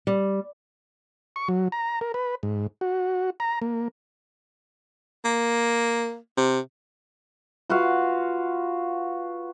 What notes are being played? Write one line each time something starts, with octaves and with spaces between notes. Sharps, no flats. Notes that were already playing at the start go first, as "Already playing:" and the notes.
G3
C#6
F#3
A#5
A#4
B4
G#2
F#4
A#5
A#3
A#3
C3
F4 F#4 B4 F5